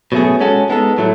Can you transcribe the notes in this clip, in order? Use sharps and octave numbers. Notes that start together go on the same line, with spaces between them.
B2 F#3 A3 C#4 G#4
G#3 C#4 F#4 A4
G#3 B3 D#4 A4
A2 F#3 A3